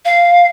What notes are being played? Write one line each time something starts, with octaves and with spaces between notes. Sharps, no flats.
F5